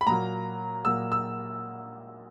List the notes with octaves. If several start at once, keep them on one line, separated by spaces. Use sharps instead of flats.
B5
A#2 F#3 A#3 A#5
A#2 F#3 A#3 E6
E6